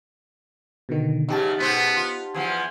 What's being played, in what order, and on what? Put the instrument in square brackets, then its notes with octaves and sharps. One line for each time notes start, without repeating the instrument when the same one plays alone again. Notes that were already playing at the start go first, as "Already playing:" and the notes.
[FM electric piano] B2 D3 D#3
[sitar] E2 C#3 F#3 [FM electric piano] D#4 G4 A5
[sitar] G#2 B2 C5 [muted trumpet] B3
[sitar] F4
[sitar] E2 F3 B3 [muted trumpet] G#4